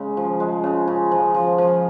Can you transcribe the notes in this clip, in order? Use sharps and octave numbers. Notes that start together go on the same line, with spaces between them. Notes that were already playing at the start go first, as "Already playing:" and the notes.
Already playing: C#3 G#3
F3
G#3
C#3
C#3
F3
F3
F3